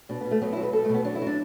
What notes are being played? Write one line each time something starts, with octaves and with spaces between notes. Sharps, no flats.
B2 D4
B2 B3
A3
F#3 B3
F#3 E4
B4
B2 A4
A3
B2 B3
F#3 D4
E4
F#3
D4